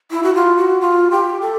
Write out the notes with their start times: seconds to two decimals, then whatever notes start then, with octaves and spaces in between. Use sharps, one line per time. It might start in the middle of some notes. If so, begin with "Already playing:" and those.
0.11 E4
0.23 F#4
0.35 F4
0.57 F#4
0.81 F4
1.11 G4
1.41 A4